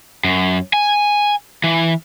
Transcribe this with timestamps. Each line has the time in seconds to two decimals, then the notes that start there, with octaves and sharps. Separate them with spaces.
0.24 F#2
0.73 G#5
1.64 E3